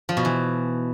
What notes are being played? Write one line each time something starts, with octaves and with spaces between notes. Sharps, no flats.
F3
B2
E3